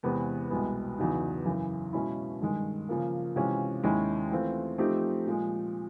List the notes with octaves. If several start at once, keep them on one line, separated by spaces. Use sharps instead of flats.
E2 C3 E3 G#3 B3
C2 B2 G#3 B3
E2 C#3 F#3 B3 D#4
F#2 C#3 E3
B2 G#3 C#4 E4
G2 D#3 G#3
C#3 F3 A#3
C3 E3 G#3 C#4 F4
D#2 D#3 G#3 C#4 E4
E3 A3 C4 F4
F3 A3 C4 D#4 G4
A#2 F3 G#3